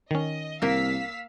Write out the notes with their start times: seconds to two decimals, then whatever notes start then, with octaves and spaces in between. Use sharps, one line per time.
0.11 D#3 C#4 D#5
0.62 C2 A#3 A#4 F5 E6 B6